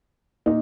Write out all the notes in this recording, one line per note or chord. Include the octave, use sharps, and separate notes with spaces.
A#2 D#4